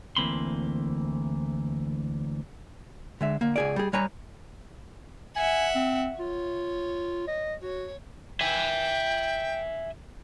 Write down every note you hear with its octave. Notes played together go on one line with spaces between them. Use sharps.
D2 E3 A#3 C4 B5 C6
D3 G#3 E5
D3 A#3
C#2 G#4 D5
G3 G#4
G3 B4 C#5 G#5 A#5
E5 F#5 G#5
C4
F4 C#5
D#5
F#4 C#5
E5 G5 G#5